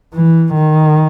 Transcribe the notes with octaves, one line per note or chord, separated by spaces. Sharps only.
E3
D#3